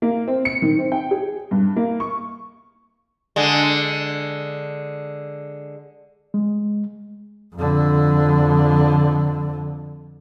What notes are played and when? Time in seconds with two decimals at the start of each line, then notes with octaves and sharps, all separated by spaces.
0.02 A#3
0.28 C4
0.45 C#7
0.62 D#3
0.79 C4
0.92 G5
1.11 G#4
1.51 G2
1.76 A#3
2.00 C#6
3.36 D3 G#3
6.34 G#3
7.55 F2 D3